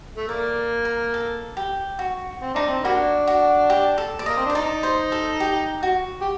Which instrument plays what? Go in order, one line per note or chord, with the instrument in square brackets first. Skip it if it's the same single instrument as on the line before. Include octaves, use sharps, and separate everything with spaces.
[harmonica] A3
[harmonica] A#3 [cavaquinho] D5
[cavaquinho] A#4
A4
G4
F#4
[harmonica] C4
[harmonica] D4 [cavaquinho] D#4
[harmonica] C4
[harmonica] G3 A#3 D4 [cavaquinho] F#4
[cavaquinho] F#4
G4
A4
D5
[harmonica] A#3 [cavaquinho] D#5
[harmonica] C4
[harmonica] D4 [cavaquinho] C5
[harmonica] D#4 [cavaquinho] D5
[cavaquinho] C5
A4
G4
F#4
[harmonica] G4